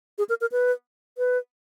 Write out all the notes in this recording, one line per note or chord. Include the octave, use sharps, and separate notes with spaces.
G#4
A#4
A#4
B4
B4